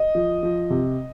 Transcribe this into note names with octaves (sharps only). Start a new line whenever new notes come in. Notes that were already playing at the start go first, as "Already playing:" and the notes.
Already playing: D#5
F3
F3
C3